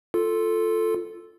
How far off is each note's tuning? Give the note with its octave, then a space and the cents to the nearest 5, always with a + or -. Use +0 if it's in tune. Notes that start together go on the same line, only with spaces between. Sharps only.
F4 +0 A4 +0